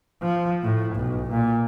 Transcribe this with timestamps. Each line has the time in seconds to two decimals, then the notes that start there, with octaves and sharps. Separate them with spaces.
0.22 F3
0.63 A2
0.95 B1
1.31 A#2